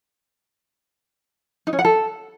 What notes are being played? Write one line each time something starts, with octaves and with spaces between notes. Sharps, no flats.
D#4
C#4
F#5
A4